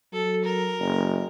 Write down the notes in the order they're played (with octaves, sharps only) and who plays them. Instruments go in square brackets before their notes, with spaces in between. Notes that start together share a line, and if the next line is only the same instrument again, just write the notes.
[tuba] F#3 [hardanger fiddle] A4
[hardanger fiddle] A#4
[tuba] F#1